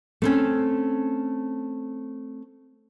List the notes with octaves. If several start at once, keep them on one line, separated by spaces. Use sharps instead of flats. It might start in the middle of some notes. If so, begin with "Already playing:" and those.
A3 C4 C#4